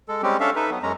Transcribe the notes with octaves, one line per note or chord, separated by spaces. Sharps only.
G#3 A4
G3 G#3 C4 C#4 G4
C#4 D4 A4 E5 F5
D#4 A4 B4 E5
F#3 B3
F#2 G#3 C#4 A#5